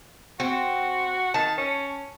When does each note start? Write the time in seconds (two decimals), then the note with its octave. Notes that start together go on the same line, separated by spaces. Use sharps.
0.40 C4 F#4
1.34 D#3 A5
1.58 C#4